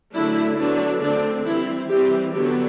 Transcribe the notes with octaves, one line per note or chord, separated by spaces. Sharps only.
D3 F#3 A3 D4 E4
D3 F#3 B3 D4
D3 A3 C4 D4
E3 G3 C4 E4
E3 G3 C4 G4
D3 F#3 B3 D4 G4